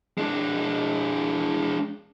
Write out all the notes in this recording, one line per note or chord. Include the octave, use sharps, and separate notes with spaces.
G#3 D4